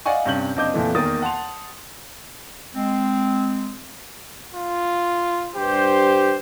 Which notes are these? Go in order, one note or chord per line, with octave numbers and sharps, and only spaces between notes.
D5 D#5 F5 F#5 G#5 C#6
G2 C3 C#4 G6 F#7
F#1 C4 D4 D#5 D6 G6
F2 A#2 E3 A3
E2 D#3 A#3 D#6 A6
F#5 A5 C6 F7
G#3 C4
F4
G2 G4 C5